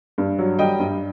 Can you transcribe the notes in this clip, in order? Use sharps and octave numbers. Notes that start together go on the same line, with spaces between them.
G2
F#3
G3 D#5 G5
G2